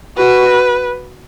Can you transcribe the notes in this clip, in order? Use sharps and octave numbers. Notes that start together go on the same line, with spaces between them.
F#4 B4